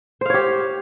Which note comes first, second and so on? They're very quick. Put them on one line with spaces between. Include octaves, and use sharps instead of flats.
C5 F5 C#5 G4